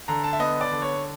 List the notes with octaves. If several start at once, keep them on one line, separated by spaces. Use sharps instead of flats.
D3 A#5
A5
E5
B3 D#5
D5
D3
C#5